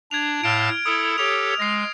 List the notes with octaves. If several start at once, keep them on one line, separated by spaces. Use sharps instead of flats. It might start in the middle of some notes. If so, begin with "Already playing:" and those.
D4 G#6 F7
A2 F5 A5 F6 D7
E4 A4 D#6
G4 A4 C#5 F7
G#3 A#6 C7